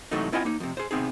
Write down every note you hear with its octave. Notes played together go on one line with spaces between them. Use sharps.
G#2 C3 E3 F#3 A3 D#4
C4 E4 F4 D#5 F#5 G#5
A#3 D#4
F2 C3
G#4 C5
C3 B3 C4 D#4 G#4